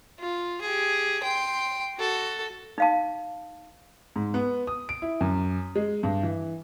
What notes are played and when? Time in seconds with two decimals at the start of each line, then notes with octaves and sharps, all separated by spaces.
0.19 F4
0.61 G4 G#4
1.23 G5 C6
1.97 F#4 A4
2.78 D#4 F5 A5
4.16 G#2
4.34 B3
4.67 D#6
4.89 D7
5.02 E4
5.21 F#2
5.76 G#3
6.03 G2
6.23 E3